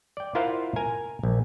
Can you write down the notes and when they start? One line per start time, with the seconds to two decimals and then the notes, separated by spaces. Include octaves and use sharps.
0.17 D5 G5
0.35 E4 F4 A#4 C5 F5 F#5
0.76 A#4 G#5 A#5
1.23 A#1